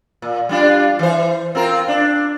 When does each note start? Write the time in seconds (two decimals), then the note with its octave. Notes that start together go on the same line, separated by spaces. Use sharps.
0.22 A#2
0.49 G3 D4 F4
0.99 E3 C5
1.55 C4 F4 A#4
1.88 D4